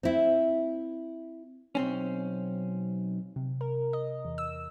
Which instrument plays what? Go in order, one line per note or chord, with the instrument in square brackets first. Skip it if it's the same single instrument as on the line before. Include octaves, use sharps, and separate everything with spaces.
[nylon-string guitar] C4 E4
[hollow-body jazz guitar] B1 C4 C#4
[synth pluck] C3
A#4
D#5
E2
E6